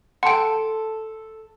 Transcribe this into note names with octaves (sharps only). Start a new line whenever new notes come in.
A4 F#5 G5 A5 C6